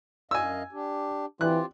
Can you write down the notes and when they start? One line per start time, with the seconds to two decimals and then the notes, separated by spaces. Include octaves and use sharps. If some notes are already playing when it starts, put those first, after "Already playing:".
0.31 F#2 D#5 F5 G#5 E6
0.72 D4 G4
1.41 E3 C4 F4 G4 F#6